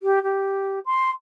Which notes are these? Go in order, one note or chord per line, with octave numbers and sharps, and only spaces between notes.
G4
G4
C6